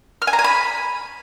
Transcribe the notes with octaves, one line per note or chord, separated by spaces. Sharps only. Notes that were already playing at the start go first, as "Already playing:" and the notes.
F6
G#5
A#5
G#5
B5